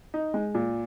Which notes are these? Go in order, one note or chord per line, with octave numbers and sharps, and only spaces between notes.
D#4
G#3
A#2